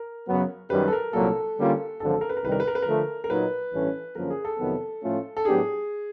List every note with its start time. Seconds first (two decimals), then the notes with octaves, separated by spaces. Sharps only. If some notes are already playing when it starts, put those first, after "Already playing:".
Already playing: A#4
0.27 F#2 C#3 F#3 B3
0.70 F#2 D#3 G3 B4
0.88 A4
0.93 A#4
1.13 C2 A#2 F#3 A#3 A4
1.57 D3 G3 A#3 C#4 F4
2.00 G#1 F#2 D3 F3 A4
2.21 A#4
2.29 B4
2.37 A#4
2.43 C2 C3 D#3 G3 B4
2.52 A#4
2.60 B4
2.68 A#4
2.75 B4
2.82 D3 F3 A3 A#4
3.24 A#4
3.30 A#2 F#3 A#3 D#4 B4
3.72 A1 G2 E3 A3 C#4
4.15 F#2 D3 F3 A#3 C#4 A#4
4.30 G#4
4.45 A4
4.59 F2 C3 D#3 F#3 B3
5.02 A2 F3 A3 C#4 F4
5.37 A4
5.45 A2 F#3 B3 D4 G4 G#4